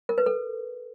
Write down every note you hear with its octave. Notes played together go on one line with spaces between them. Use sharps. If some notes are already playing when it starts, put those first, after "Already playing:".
A#4
B4
A4